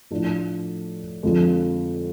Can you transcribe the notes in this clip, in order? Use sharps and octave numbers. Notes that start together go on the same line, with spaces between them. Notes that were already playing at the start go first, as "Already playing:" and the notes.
A2 F3 A3 D4
F2 D3 F3 G#3